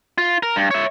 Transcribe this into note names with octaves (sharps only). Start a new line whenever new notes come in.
F4
A#4
G2
C#5 E5